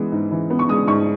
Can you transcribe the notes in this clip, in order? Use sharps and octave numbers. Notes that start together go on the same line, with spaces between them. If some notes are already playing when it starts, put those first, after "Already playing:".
Already playing: E3 G#3 B3
G#2
E3
B3
C#6
G#3 D#6
G#2 C#6